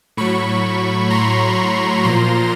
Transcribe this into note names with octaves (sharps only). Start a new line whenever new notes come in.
A2 F#3 B5 C#6
A#5 C6
A#2 F3 A#5 C6